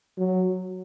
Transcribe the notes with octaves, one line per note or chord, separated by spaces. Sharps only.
F#3